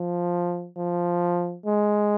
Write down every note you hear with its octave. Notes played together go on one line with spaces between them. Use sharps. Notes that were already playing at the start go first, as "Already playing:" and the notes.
Already playing: F3
F3
G#3